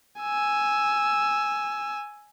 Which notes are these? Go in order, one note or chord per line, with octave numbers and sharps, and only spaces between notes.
G#5 E6